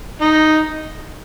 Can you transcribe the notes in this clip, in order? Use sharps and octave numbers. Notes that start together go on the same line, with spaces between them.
D#4